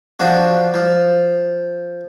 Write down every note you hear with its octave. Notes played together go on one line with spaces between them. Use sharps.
F3 D4 F#4
F3